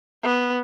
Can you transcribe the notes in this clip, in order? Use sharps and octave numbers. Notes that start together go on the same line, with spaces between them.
B3